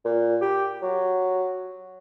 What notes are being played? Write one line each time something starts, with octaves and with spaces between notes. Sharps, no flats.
A#2
G4
F#3